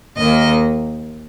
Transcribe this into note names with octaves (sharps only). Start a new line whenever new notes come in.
D#2 D#3 A#3 D#5